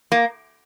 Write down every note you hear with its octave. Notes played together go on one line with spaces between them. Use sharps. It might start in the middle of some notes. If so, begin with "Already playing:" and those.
A#3